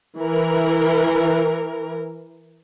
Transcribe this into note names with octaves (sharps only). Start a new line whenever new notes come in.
E3 A#4